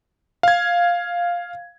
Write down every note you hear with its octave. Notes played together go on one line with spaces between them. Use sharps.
F5 G#6